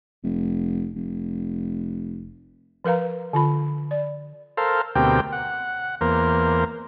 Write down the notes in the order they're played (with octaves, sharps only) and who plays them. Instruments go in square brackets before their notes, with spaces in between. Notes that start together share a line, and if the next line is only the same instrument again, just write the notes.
[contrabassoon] F1
F1
[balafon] F3 A#4 B4 F5 A#5
D3 F4 B5
D5
[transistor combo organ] A4 A#4 C5 F5
D2 B2 C4 G4 A#4 G5
F#5
E2 A#3 A#4 C5